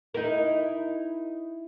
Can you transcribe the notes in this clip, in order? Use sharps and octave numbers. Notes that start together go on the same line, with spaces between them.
D#4 E4 A#4